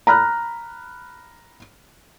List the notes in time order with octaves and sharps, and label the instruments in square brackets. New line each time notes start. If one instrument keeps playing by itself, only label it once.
[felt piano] A#5 B5 F6 F#6